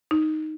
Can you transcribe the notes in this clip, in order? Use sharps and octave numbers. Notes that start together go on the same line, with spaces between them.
D#4